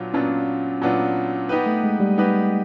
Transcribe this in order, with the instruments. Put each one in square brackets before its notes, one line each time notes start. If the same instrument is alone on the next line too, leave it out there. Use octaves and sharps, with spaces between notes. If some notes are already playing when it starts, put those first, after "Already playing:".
Already playing: [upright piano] A#2 F#3 B3 D4 F4
[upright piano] A#2 F#3 B3 D4 F4 [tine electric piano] C#4
[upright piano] A#2 F#3 B3 D4 F4
B3 D#4 G4 B4
[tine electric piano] A3
G#3
G3
[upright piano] B3 D#4 G4 B4